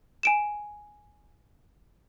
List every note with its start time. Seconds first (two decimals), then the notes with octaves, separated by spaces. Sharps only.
0.23 G#5 D7 E7